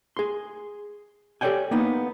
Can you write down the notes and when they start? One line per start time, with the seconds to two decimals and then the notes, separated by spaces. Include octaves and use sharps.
0.17 G#4 C6
1.41 G4 A4 C#5 D5 G5 G#5
1.71 A#3 B3 D#4